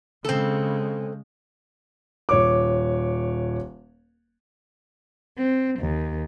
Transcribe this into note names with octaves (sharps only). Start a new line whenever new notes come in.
C#3 G#3 C4 A4
D#1 C#5 D6
C4
D#2